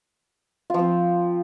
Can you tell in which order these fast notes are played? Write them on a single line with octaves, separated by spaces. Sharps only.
F4 F3 C4